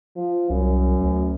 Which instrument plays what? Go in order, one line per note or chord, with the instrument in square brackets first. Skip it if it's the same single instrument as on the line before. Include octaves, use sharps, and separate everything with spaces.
[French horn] F3
[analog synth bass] C2 [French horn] F#2
[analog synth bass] D2